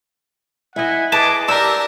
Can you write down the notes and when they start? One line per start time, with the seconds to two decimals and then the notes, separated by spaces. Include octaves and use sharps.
0.76 E4 D#5 E5 F#5 G#5
1.12 G#4 B4 D#5 A5 D6
1.48 D4 G4 A#4 A5 E6